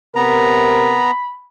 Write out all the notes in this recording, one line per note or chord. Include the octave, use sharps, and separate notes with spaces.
C3 B3 A#4 A#5 B5